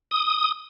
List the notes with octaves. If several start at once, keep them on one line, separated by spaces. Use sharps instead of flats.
D#6